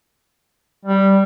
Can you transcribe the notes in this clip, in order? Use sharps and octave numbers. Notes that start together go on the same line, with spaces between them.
G3